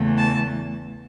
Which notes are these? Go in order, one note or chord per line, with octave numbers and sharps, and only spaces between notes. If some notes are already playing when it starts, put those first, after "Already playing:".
Already playing: E2 C#3 E3 A3
A5